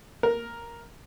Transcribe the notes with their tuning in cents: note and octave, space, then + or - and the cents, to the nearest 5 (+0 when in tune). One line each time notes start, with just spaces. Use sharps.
A#4 +5